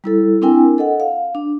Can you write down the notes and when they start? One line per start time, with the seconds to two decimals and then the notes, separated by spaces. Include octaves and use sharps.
0.04 G3 E4 A4
0.42 C4 D4 E4 A#4 G5 G#5
0.78 A4 D#5 F#5
1.00 F5
1.35 D4